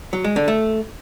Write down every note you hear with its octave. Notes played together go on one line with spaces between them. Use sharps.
F#3
G#3
D3
A3